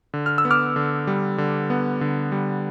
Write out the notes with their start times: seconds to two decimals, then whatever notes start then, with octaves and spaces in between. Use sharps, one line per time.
0.14 D3
0.26 F6
0.38 E6
0.45 B3
0.51 D6 F6
0.76 D3
1.07 G3
1.38 D3
1.70 B3
2.01 D3
2.32 G3